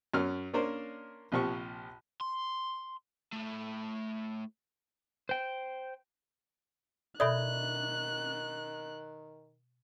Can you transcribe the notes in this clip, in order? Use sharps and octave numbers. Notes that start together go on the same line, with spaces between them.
F#2 C#4 F6
A#3 C#4 D4 A#4 C5 D5
A#1 C3 F3 G4 C#6
C6
A2 A3
C5 G5
B2 D#3 A4 D5 E5 B5 D#6 F#6